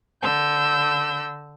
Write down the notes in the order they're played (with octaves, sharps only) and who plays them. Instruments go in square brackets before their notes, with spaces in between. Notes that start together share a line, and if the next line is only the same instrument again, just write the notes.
[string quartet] D3 E6 G6